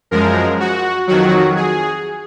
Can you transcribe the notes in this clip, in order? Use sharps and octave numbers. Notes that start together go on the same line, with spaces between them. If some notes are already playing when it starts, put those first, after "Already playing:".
F#2 F3 G#3 A#4
F#4
F2 D#3 F#3 F#4
G#4